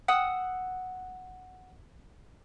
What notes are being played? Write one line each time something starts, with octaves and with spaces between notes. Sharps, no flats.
F#5 D#6 E6